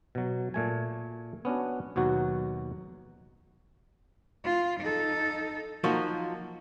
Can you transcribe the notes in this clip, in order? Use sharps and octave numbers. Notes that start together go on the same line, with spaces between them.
B2 F#3
A#2 A3 G#5
B3 C#4 D4 F#4
D#2 B2 F#3 F#4
F4
D#4 A4
F3 F#3 A#3 D#4 F#4